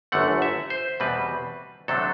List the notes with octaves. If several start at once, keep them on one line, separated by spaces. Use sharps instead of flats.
G1 F#2 D3 A3 F#5
E5
C5
E2 B2 G3 C4 B4
D2 C3 F#3 A3 D4 A4